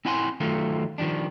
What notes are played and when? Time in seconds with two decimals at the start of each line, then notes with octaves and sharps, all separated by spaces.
0.05 C4 E4 F#5 G#5 C6
0.40 D#3 F#3 A3 F4
0.98 D#3 F3 G3 D4